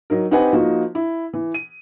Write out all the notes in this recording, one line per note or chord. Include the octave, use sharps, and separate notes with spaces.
F#3 D#4 A#4
C4 D#4 G4 B4 F#5 G#5
F3 A#3 D#4 F#4
E4
E3
D#7